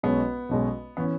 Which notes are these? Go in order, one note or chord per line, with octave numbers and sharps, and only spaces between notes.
B1 B2 G#3 B3 C#4
B1 B2 G#3 C#4
E3 B3 C#4